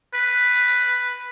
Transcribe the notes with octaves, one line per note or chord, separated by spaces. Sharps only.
B4